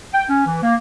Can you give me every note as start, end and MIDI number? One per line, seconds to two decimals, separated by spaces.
0.13 0.23 79
0.29 0.45 61
0.46 0.58 52
0.62 0.75 58